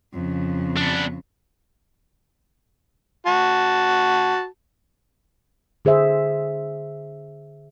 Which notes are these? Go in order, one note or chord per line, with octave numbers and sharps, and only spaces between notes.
F2 C#3
B3 D4
F#4 A5
D3 G#4 C5 E5